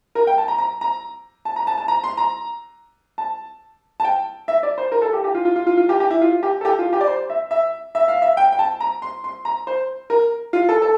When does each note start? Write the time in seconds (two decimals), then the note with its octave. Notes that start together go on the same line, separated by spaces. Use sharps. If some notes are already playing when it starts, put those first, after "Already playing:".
0.15 A#4
0.27 G5
0.38 A5
0.48 A#5
0.58 A#5
0.81 A#5
1.45 A5
1.56 A#5
1.67 A5
1.78 A5
1.88 A#5
2.04 C6
2.17 A#5
3.18 A5
4.00 A5
4.04 G5
4.48 E5
4.63 D5
4.78 C5
4.92 A#4
5.02 A4
5.13 G4
5.24 G4
5.35 F4
5.45 F4
5.56 F4
5.67 F4
5.77 F4
5.89 G4
6.00 G4
6.10 E4
6.21 F4
6.43 G4
6.61 A4
6.65 G4
6.79 F4
6.93 G4
7.01 D5
7.08 C5
7.30 E5
7.51 E5
7.95 E5
8.08 F5
8.22 E5
8.37 G5
8.52 G5
8.59 A5
8.80 A#5
9.02 C6
9.24 C6
9.45 A#5
9.67 C5
10.10 A#4
10.53 F4
10.69 A4
10.82 A4